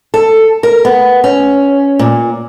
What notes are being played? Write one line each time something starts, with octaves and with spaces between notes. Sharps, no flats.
A4
A#4
B3
C#4
A#2